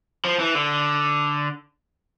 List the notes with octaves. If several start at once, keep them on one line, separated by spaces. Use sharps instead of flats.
F3
E3
D3